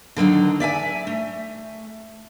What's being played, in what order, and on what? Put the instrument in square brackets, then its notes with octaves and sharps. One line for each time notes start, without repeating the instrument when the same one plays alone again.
[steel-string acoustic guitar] D3 D#3 F#3 D#4
D5 E5 F5 G#5
A3